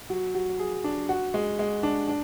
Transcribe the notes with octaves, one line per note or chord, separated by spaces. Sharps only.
F#3
F#3
G#4
D4
F#4
G#3
G#3
D4
D4